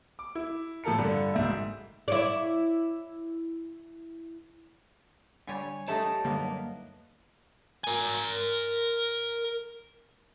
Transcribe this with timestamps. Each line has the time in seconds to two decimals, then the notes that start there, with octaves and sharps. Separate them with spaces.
0.19 D6
0.35 E4
0.84 A2 F3 A4 A#4 C#7
0.98 G2 D3
1.34 F#1 G#2 E5
2.08 E4 C#5 D5
5.47 D3 G3 C#5 G#5
5.88 A3 D#4 G4 C#5 A5
6.24 F#2 D3 G3 A#3 B3
7.84 A#4 G#5